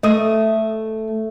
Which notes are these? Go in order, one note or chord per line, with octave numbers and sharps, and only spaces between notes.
A3 D#5 D#6